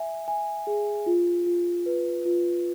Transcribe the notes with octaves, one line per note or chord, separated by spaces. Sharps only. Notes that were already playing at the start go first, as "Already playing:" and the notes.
Already playing: E5 G#5
G#5
G#4
F4
F4
B4
F4